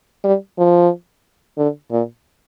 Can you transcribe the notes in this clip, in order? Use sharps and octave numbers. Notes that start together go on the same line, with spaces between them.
G3
F3
D3
A#2